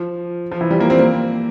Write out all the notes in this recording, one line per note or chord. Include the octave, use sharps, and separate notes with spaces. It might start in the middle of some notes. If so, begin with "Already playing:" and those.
Already playing: F3
F3
E3
G3
A#3
C4
A#3